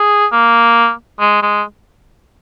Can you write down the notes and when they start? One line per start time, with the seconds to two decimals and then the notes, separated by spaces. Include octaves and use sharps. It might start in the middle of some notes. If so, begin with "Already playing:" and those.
Already playing: G#4
0.32 A#3
1.20 G#3
1.42 G#3